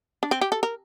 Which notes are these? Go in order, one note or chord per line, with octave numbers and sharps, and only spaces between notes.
D4
C4
G4
A4
A#4